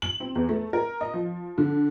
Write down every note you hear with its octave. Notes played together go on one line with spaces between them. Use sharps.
F#7
C4
E2
A3
A#4
D#5
F3
D3